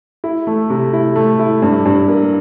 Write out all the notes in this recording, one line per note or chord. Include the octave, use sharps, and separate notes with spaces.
E4
A3
C3
E4
A3
E4
G2
G2
A#3